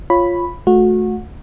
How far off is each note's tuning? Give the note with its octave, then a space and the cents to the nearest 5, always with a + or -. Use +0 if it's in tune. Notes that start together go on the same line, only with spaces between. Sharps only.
F4 +0 C#5 -10 B5 +0
A3 -25 F#4 -25